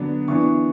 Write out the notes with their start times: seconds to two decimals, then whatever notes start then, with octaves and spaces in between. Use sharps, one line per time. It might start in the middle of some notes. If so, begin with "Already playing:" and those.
Already playing: D3 F#3 B3 D4
0.28 E3 B3 D4 C#6